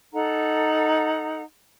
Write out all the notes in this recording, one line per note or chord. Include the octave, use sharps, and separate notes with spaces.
D#4 A4 F#5 A#5